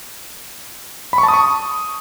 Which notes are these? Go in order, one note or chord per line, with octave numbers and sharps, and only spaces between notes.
B5
C#6
A5
D#6
C#6